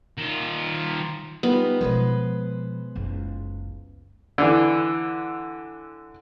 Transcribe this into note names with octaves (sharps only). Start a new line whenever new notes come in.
D#3 F4
G3 B3 D#4 F4
B2 F3 G#3 B4 C5
F#1 C#2
D3 E3